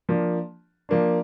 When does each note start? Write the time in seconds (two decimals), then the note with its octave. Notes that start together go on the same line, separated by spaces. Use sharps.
0.09 F3 A#3 D4
0.89 F3 A#3 D4